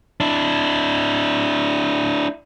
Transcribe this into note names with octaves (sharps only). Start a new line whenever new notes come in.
D4 E4